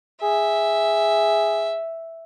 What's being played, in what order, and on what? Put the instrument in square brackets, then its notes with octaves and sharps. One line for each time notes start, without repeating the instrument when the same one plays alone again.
[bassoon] G#4 [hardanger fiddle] E5